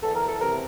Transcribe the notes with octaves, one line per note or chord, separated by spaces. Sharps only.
E2 A4
A#4
A4
C3 A#4